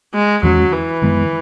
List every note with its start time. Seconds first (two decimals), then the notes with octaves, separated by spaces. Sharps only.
0.14 G#3
0.43 E2 D#3 F#3 G#3 C#4
0.73 E3
1.02 F#2 D#3 G#3 B3